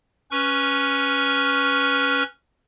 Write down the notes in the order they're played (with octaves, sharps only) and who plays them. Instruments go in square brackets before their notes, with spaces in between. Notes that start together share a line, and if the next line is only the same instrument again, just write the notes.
[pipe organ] C#4 B4 C#6 F6